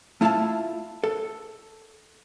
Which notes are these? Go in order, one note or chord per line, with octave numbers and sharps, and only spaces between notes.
A3 E4 F4 E5 A5
A4